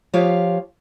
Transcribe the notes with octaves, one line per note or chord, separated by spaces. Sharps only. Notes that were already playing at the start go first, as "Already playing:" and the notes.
F3 F4 G4 C#5 F5